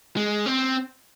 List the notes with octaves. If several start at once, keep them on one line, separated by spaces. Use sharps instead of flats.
G#3
C4